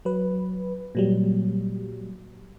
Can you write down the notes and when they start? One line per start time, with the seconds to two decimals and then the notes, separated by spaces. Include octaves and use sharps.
0.05 F#3 B4
0.95 A#2 F#3 G3